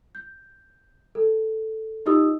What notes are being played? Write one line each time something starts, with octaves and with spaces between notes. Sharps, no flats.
G6
A4
D#4 F4 G4 D#5 D#6 E6